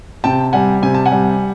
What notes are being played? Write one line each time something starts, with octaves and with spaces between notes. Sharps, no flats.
C3 G5 A5
G3 F#5 G#5
C3 G#5
A5
F#5 G#5
G3